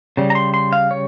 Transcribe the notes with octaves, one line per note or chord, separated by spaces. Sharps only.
C#3 G3
A#5
C6
C6
F5
C#5